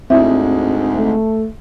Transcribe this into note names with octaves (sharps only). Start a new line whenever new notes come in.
D2 G#2 C4 E4 E5
A3